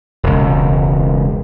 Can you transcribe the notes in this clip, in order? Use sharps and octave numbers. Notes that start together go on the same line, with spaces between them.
E1 C#2